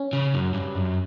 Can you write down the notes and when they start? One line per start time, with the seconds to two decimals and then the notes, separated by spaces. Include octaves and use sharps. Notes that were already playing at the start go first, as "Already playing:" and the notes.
Already playing: C#4
0.13 C#3
0.34 F#2
0.54 G2
0.75 F#2